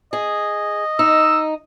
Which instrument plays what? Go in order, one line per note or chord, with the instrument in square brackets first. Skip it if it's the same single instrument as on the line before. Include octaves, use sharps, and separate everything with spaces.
[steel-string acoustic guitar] G#4 [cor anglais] D#5
[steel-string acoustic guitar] D#4 [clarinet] E6